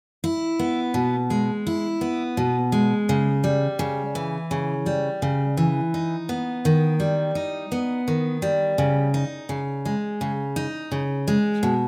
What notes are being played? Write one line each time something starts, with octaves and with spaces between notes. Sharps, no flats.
E4
B3
B2
G#3
E4
B3
B2
G#3
C#3
G3
C#3
E3
C#3
G3
C#3
E3
D#4
B3
D#3
G3
D#4
B3
D#3
G3
C#3
D#4
C#3
G#3
C#3
D#4
C#3
G#3
B2